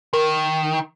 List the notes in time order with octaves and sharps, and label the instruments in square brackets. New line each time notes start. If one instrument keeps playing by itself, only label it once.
[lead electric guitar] D#3 [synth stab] A#4